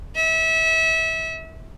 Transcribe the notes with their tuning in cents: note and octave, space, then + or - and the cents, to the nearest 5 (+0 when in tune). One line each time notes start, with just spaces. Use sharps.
E5 -30